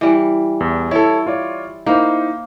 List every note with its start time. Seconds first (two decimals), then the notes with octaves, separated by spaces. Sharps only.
0.01 E3 G3
0.60 E2
0.91 E4 A4 C#5
1.27 F4 C#5 D5
1.86 A#3 D#4 E4 C5